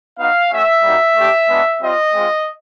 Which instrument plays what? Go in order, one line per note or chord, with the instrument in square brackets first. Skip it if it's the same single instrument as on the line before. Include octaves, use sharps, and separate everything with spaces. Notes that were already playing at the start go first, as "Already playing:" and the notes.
[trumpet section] B3 D#4 F#4 F5
A3 C#4 F#4 E5
G3 A#3 D#4 F#4
A3 D4 G4
G#3 B3 D4 F#4
G3 C4 F4 D#5
G#3 C4 F4